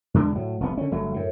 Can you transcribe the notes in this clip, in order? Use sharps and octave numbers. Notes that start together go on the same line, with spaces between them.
E2 D3 G#3 D4
A2 F#3
F1 C2 B3
D3 C#4
G1 F#3 A3
F#2 A2